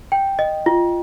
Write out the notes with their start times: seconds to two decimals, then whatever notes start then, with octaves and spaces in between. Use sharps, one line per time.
0.12 G5
0.39 D#5
0.66 F4